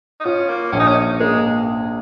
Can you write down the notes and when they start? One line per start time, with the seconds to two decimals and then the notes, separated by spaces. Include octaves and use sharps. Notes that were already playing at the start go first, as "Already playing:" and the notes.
0.20 D#4
0.25 C#4 F4
0.49 A#3
0.72 A#1 C#4
0.80 D#4
0.88 C#4
1.20 G#3 A#3